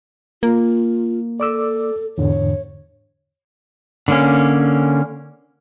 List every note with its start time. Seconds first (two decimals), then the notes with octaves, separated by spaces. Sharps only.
0.43 A#3 F4
1.40 A4 D5 D6 E6
2.18 E2 G#2 D3 C#5
4.08 D3 A#3 C#4